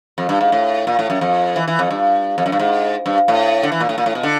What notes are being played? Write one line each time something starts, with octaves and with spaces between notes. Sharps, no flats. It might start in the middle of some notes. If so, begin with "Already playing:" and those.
F2
G2
G#2
A2
A#2
A2
F#2
F2
E3
E3
F2
G2
F2
F#2
G2
G#2
G2
A2
D3
E3
A#2
A2
A#2
A2
B2
D3